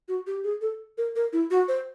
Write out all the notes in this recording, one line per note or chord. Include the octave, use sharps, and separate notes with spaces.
F#4
G4
G#4
A4
A#4
A#4
E4
F#4
C5